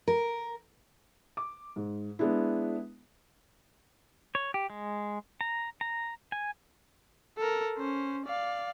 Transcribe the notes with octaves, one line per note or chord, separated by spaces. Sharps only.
A#4
D6
G#2
G#3 B3 D4 E4
C#5
G4
G#3
A#5
A#5
G#5
A4 A#4
C#4 C5
D5 F5